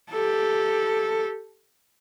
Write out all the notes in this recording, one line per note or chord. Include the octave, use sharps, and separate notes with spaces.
G4 A4